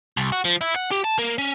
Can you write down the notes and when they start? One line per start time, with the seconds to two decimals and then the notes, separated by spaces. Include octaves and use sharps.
0.17 C2
0.32 F#4
0.45 F3
0.61 E4
0.76 F#5
0.91 G4
1.04 A5
1.19 A#3
1.38 C#4